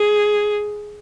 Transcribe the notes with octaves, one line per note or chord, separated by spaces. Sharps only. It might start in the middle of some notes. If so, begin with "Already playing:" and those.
Already playing: G#4